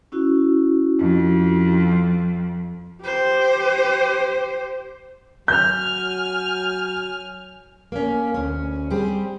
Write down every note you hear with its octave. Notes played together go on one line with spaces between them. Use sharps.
C#4 E4 F#4
F2
G4 C5
F#3 G#5 F6 G6
A#3 C#4
D2 C#4
G3 C4 G4 G#4